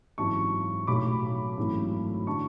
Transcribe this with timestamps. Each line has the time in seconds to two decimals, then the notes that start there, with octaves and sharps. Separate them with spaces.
0.18 G#1 F#2 E3 A5 C#6
0.87 B1 A2 F#3 A3 B5 D6
1.57 G#1 F#2 E3 A3
2.27 D3 F#3 A5 C#6